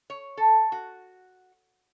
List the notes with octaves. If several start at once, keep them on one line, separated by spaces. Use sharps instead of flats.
C#5
A4
F#4